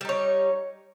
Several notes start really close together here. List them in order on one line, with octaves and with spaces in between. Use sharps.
G3 D#4 C#5